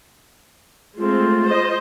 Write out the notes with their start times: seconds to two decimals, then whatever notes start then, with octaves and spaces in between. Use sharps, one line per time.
0.97 G#3 A3 C4 F4
1.47 C5 D#5